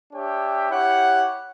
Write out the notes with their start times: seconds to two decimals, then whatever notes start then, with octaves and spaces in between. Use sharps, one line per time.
0.13 D4 G4 C#5 E5 G5
0.70 E4 G4 C#5 F#5